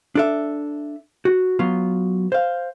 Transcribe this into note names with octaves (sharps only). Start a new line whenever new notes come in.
D4 A4 E5
F#4
F#3 B3 F4
C5 F5